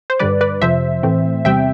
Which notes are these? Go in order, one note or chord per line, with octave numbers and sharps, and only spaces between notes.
C5
G2 D3 G3 B4 D5
B4 D5
F2 C3 F3 C5 E5
A2 E3 A3 C4
E2 C3 G3 C4 E5 G5